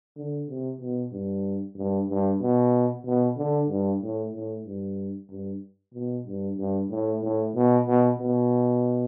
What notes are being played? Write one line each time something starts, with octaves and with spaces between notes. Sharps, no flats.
D3
C3
B2
G2
G2
G2
B2
B2
D3
G2
A2
A2
G2
G2
B2
G2
G2
A2
A2
B2
B2
B2